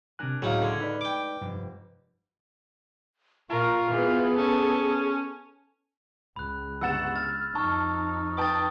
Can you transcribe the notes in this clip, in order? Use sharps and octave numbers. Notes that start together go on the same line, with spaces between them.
C3 D4 A#4 G#5 F#6
C#2 A2 F#3 D#4 G#4 F5
D3 C6 F6 G#6
D#4 B4 D5
G5 D6
F1 G2
A#2 F4 A#4 C#6
E3 B3 G#4
C#4 A4
C#2 B5 F#6
G1 F#5 E6 A6 E7
F6 A6
F2 D#4 A5 C#6 F6
B4 G5 A5 D#6 A6